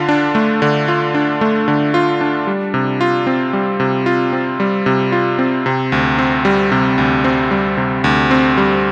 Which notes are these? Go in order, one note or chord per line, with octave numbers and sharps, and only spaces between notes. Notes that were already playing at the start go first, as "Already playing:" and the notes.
Already playing: D3 F4
D4
A3
D3
F4
D4
A3
D3
F4
D4
G3
C3
F4
C4
G3
C3
F4
C4
G3
C3
F4
C4
C3
D2
C4
G3
C3
D2
C4
G3
C3
D2
C4
G3